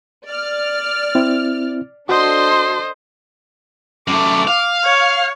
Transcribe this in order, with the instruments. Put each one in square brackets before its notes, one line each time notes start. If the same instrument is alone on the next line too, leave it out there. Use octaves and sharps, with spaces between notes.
[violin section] D5 F6
[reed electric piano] C4 E4
[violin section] D4 A4 C6 [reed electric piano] F#4 [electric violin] C5 D#5
[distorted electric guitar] F#2 A3 [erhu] D6
[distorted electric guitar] F5
[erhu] C#5